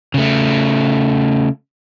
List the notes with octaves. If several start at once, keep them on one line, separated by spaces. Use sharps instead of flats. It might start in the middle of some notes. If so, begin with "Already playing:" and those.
C#3 A3